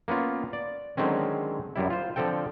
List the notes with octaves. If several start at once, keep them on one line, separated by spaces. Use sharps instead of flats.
A#3 B3 C#4 F4
D5
D3 D#3 F#3 G#3 C4 C#4
F#2 G3 E4
F4 C5
D3 F3 C4 A4 G5